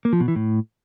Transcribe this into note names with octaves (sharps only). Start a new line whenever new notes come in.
A#3
F3
B2
E3
A2